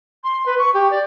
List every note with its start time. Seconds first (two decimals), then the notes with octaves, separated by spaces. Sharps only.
0.24 C6
0.46 B4
0.58 C#6
0.74 G4
0.91 D5